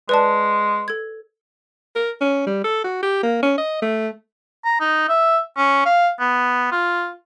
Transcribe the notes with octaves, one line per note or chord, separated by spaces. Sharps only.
G#3 B4 D5 A5
A4 G#6
A#4
C#4
G3
A4
F#4
G4
A#3
C#4
D#5
A3
A#5
D#4
E5
C#4
F5
B3
F4